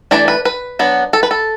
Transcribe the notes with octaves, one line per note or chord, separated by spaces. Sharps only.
E3 A3 D4 D5
B4
B4
F#3 B3 D4
A4
B4
A4